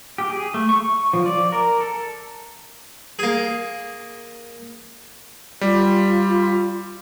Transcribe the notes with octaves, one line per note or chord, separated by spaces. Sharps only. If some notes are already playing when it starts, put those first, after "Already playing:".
G4
G#4
A3
C#6
F3
D5
A#4
A4
A#3 G#4
G3 F4